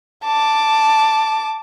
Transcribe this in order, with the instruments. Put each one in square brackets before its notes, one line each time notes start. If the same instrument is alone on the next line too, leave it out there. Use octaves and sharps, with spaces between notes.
[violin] A5 D6